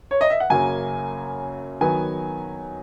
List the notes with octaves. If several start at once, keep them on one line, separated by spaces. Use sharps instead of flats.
C#5
D#5
E5
F#5
F#2 C#3 F#3 A#3 G#5
D#3 F#3 B3 G#5